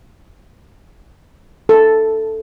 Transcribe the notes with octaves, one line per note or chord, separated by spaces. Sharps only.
A4